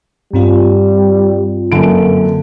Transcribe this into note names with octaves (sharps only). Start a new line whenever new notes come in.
G2 G3 C4 F4
F#2 D3 A#3 D7